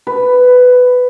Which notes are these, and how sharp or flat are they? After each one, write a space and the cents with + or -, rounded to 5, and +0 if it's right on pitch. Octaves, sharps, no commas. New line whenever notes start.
B4 +10